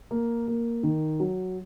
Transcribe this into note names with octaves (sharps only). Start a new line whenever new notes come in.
A#3
A#3
D#3
F#3